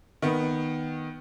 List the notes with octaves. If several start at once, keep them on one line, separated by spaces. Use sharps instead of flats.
D#3 B3